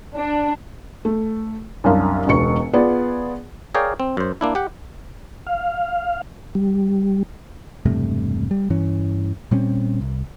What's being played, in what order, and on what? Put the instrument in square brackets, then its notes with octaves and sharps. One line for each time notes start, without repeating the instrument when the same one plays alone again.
[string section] D4
[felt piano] A3
C2 F#2 D4 F5
E1 C#2 B2 C#6 C#7
B3 F4 G#4 D5
[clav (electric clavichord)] G#4 A#4 C#5 D5 F5 G5
C4
F#2 C5
A#3 D4 E4
G4 F#5
[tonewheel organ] F5
G3
[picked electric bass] E1 G2 C3 A3
G3
G2 E3 C#4
A#2 G3 C4 C#4
C2